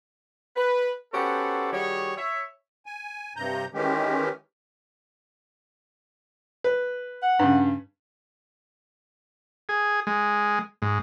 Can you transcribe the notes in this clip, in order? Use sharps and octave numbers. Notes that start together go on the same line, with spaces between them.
B4
B3 C#4 F#4 G4 A4 C5
D#3 G3 F#4 G#4 C#5
C#5 E5
G#5
G2 C3 A#5 G6
D#3 E3 G#3 C#4 G4
B4
F#5
G2 C#3
G#4
G#3
G#2